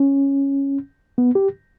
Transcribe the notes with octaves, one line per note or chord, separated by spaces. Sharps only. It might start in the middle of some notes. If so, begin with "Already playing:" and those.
Already playing: C#4
B3
G4